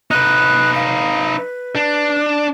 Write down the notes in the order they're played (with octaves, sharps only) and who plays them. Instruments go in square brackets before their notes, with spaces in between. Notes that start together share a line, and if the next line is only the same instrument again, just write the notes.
[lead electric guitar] D#4 B4 [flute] F#6
[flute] F5
B4
[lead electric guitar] D4